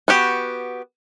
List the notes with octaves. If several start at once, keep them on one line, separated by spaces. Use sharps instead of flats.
B3 F#4 G4